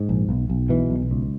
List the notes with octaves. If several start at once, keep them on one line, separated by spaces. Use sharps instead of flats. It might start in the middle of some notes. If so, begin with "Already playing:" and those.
Already playing: G#2
A#1
B1
B1
B2 E3
B1
C#2